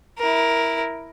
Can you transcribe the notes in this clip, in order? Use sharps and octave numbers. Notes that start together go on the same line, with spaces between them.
E4 A#4